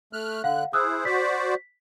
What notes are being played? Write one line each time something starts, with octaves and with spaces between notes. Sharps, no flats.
A3 F6 F#6
D3 F5 F#5 F#6
E4 G#4 C5 D#6 E6 F#6
F#4 C5 D5 B6